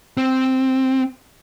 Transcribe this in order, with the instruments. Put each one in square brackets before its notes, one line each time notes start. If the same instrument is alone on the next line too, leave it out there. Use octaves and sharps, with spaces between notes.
[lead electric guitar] C4